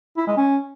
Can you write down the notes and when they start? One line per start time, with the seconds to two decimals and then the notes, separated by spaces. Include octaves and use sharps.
0.17 E4
0.27 G#3
0.37 C#4